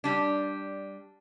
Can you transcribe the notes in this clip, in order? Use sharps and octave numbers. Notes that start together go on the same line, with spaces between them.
G3 D4